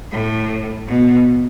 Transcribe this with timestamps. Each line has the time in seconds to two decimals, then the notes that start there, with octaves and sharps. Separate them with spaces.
0.11 A2
0.87 B2